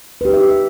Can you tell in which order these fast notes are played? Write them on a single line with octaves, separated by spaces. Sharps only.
B4 G4 D#4 E5